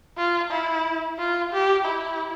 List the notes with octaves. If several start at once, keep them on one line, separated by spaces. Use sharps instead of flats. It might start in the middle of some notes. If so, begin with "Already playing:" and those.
F4
E4
F4
G4
E4